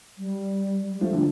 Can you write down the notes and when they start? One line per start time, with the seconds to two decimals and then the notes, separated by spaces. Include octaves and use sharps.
0.18 G3
0.92 G3
1.01 F3 A3
1.13 D3